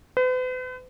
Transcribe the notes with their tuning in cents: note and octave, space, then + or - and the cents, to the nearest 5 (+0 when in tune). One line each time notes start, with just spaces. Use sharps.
B4 +45